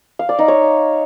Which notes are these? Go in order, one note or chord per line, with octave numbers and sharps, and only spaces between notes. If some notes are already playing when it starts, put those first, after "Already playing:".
F5
D5
D#4
C#5